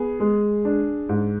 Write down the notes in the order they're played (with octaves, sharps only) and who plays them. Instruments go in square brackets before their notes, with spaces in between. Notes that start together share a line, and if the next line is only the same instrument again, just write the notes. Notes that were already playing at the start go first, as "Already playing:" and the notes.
Already playing: [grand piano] B3 G#4
G#3
D4
G#2